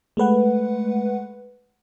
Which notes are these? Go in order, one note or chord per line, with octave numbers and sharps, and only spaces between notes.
G#3 A3 B4 F#5